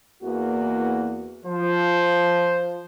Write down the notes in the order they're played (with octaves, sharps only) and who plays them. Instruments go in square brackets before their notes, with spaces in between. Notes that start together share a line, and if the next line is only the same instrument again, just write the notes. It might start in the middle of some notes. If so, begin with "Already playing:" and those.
[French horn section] E2 A#3 F#4
[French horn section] F3 [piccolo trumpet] C5